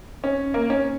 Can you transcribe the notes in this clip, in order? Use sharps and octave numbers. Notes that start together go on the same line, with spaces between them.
C#4
A#3
C#4